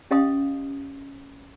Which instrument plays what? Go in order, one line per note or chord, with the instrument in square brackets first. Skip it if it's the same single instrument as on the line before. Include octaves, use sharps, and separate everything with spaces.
[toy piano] C#4 G4 D#5 F5 C6 D#6